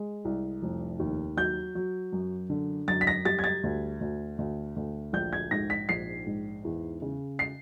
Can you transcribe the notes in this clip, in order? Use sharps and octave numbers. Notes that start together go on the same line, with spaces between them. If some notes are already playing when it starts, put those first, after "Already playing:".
Already playing: G#3
C2
F1
D#2
F#3 G6
F#3
F#2
D3
F#2 A6
B6
A#6
G3 A6
G#6
A6
D2
D2
D2
D2
A#1 G6
G#6
G#2 A#6
B6
A#1 C7
G#2
E2
C#3
C7